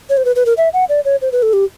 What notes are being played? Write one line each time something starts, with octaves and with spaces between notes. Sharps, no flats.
C#5
C5
B4
B4
A#4
E5
F#5
D5
C#5
C5
B4
A4
G4